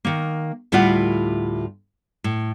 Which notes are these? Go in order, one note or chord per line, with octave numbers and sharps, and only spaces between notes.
D#3 A#3
D2 A2 G3 E4 F4 F#5
A2